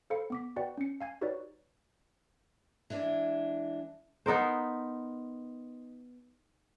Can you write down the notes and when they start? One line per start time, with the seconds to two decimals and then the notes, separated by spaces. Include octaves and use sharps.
0.10 A4 C5 F5 B5 C#7
0.30 B3 D6 B6
0.56 F#4 B4 D5 F#5 G5
0.77 C#4 C#7
1.01 F5 G#5 G#6
1.21 D#4 F#4 G4 B4 C#5 D5
2.90 E3 G#3 D4
4.26 B3 D#4 A#4 C5